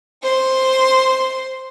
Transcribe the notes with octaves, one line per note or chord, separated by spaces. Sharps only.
C5 C6